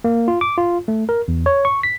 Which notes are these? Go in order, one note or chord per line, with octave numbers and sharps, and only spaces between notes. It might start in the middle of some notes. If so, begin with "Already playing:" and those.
A#3
F4
D6
F4
A3
A#4
E2
C#5
C#6
B6